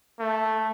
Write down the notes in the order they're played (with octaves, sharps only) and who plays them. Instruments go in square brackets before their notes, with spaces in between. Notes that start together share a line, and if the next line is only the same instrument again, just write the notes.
[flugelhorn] A3